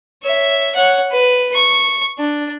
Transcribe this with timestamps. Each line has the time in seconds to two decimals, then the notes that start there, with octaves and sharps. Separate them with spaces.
0.23 C#5 E5
0.75 C#5 F#5
1.11 B4
1.53 C#6
2.19 D4